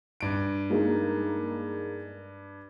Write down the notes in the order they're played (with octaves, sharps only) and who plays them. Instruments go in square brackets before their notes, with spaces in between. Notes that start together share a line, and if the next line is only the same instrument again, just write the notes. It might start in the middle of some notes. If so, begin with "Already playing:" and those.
[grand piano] G2 D7
[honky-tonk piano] G#3 A#3 D#4